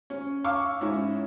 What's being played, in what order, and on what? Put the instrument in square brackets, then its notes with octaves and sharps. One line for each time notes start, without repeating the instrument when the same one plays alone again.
[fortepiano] C#4
F5 C#6 D6 E6
G#2 C#4 E4